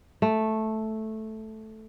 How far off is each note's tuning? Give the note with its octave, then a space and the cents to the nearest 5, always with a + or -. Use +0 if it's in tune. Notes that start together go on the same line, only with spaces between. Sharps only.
A3 -5